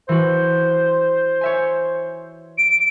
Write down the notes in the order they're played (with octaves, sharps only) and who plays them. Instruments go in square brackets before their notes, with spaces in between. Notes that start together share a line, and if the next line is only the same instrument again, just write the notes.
[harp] E3 F#4 [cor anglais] C5
[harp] C#5 E5 G#5
[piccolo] D7